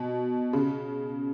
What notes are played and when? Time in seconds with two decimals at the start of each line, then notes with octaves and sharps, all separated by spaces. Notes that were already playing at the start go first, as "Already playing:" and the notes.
Already playing: B2
0.53 C#3